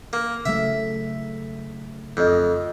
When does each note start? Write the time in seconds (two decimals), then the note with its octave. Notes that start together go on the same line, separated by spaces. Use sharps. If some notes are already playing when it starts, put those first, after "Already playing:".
0.13 A#3
0.45 C#3 F#3 A3 E5
2.17 F2 F4 D#5